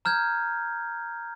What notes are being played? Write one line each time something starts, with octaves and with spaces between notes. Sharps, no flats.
A#5 F6 G6 G#6